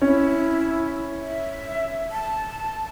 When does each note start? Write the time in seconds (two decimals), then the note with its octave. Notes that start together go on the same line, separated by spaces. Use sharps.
0.01 C#4 E4
1.23 E5
2.11 A5